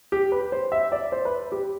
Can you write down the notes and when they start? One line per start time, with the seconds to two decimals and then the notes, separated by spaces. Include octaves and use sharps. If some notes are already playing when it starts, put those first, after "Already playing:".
0.12 G4
0.32 B4
0.52 C5
0.72 E5
0.92 D5
1.12 C5
1.25 B4
1.52 G4